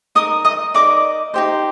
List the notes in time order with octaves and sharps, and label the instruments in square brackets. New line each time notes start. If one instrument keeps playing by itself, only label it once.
[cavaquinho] D#4 A#4 D#5 D#6
D#5 D#6
D#4 A#4 D5 D#5 D6
D#4 G4 C5